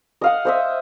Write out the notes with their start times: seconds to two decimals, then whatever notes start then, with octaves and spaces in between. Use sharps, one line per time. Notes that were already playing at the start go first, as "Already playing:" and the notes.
0.21 D#5 F5 F#5
0.45 C5 D#5 E5